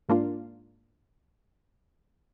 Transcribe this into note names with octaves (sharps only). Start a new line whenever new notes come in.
G#2 A#3 D4 F4